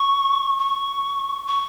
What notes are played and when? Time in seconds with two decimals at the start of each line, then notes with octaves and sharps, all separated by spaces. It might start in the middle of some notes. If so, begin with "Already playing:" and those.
Already playing: C#6
0.59 C#6
1.47 C#6